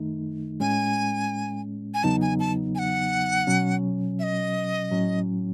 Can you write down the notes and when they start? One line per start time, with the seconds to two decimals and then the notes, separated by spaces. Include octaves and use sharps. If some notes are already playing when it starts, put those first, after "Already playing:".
Already playing: F#2 D#3 A3 D#4
0.60 A2 G#3 C#4 G#5
1.94 G#5
2.04 E2 C#3 F#3 B3 D#4 A5
2.22 G#5
2.40 A5
2.75 G#5
2.79 F#5
3.47 B2 F#3 C#4
4.19 E5
4.23 D#5
4.91 A2 F#3 C#4